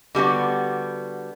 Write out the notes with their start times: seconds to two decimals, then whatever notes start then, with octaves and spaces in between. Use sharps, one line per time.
0.15 D3 G3 B3 F#4